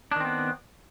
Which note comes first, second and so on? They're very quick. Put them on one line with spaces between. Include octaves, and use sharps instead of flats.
D4 D#3 C4 B3